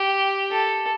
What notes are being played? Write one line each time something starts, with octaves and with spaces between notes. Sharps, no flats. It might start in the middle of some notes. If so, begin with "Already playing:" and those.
Already playing: G4
A4